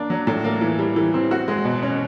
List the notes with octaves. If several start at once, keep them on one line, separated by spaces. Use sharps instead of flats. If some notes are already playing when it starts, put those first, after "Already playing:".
Already playing: A#3 D4
F#3
A2
A#3
E3
G3
E3
C4
F#4
G#3
B2
C#4